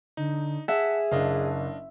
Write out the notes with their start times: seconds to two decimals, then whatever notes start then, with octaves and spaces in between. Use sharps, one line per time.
0.17 D3 D#4
0.68 G#4 E5 F#5 A5
1.12 F#1 D4 D#5 F5